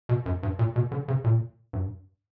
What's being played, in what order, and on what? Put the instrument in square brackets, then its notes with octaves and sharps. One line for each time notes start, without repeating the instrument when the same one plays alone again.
[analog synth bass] B2
F#2
G2
A#2
B2
D3
C#3
A#2
G2